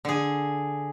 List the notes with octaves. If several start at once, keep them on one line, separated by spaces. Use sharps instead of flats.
D3 G#4